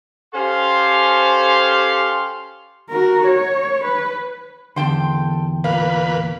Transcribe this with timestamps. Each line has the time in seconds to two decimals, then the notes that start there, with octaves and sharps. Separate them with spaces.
0.34 C#4 G4 A4 C5 F5 C6
2.90 F#4 A#4
3.26 C#5
3.84 B4
4.76 E2 D3 A4 G5 C6
5.64 A#2 B4 F5